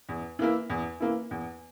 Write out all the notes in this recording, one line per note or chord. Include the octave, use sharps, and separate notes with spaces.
E2
E3 A#3 E4
E2
E3 A#3 E4
E2